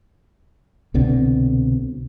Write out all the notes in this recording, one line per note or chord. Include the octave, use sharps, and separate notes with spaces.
C2 B2 D3 C4